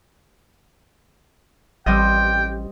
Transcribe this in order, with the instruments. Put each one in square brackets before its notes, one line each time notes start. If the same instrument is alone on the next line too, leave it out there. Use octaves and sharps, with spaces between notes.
[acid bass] A1 [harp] G3 C4 D#5 [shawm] G5